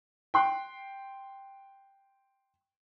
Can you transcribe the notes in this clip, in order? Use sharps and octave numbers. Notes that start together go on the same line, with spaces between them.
G5 C6 F#6